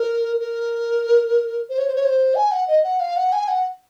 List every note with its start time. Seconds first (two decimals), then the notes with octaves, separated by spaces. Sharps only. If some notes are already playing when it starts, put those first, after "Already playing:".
Already playing: A#4
0.40 A#4
1.70 C5
1.78 C#5
1.88 C5
1.95 C#5
2.05 C5
2.35 G#5
2.52 F#5
2.68 D#5
2.84 F#5
3.00 F5
3.17 F#5
3.33 G#5
3.48 F#5